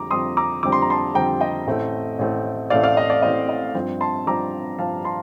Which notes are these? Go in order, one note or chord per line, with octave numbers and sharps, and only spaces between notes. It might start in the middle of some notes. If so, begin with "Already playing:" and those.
Already playing: F2 D3 G3 C4 A#5 D6
F2 D3 G3 C4 C6 D#6
A#5 D6
F2 D3 G3 C4 D6
C6
A#5
A5 C6
F2 D3 G3 C4 G5 A#5
D#5 G5
A1 A2 A3 C4
A1 A2 A3 C4
A1 A2 A3 C4 D5 F5
D5 F5
D#5
D5
A1 A2 A3 C4 D#5
D#5
G2 F3 C4
A5 C6
G2 F3 C4 A#5 D6
G2 F3 C4 F5 A5
A5 C6